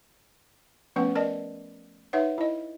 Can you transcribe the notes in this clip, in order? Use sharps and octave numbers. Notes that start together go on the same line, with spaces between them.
F3 A3 B3 C#4 B4 F#5
A#4 D5 D#5 A5
D#4 B4 C#5 E5 F#5
E4 D#5